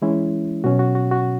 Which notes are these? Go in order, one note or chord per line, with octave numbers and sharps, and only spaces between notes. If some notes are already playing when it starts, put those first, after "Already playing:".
E3 G#3 C#4 E4
B2 F#3 C#4 F#4
F#4
F#4
F#4